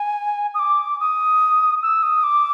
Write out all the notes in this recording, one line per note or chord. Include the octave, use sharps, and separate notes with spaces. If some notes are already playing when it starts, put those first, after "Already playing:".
Already playing: G#5
D#6
D6
D#6
E6
D#6
D6